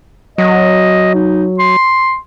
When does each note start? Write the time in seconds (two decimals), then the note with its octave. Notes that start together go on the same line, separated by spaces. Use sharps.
0.38 F#3 D#5
1.14 D#4
1.59 C6